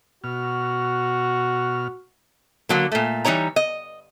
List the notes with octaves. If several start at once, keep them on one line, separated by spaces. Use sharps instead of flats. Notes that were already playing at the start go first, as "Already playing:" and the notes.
B2 F#4 F6
D3 F#3 A#3
A#2 A3
E3 G3 D#4 C#5 A#5
D#5